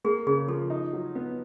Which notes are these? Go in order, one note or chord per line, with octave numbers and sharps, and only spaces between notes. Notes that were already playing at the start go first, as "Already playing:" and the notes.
A#3 G#4
C#3 G#4
F3 A4
D#4
F#3
B3